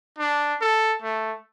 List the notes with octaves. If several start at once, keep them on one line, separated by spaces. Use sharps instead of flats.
D4
A4
A3